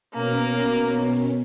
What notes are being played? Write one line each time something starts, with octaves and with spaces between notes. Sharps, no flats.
B2 A#3 C#4 A#4